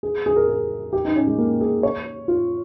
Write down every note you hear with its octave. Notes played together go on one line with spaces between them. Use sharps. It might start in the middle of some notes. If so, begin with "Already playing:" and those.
G#4
G#4
A#4
G#4
G4
D#4
C#4
G#3
A#3
G#4
C#5
F4